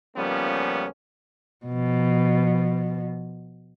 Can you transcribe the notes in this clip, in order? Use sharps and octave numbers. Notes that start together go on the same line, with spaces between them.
C#2 F3 G3 A#3 B3 C#4
B2 F3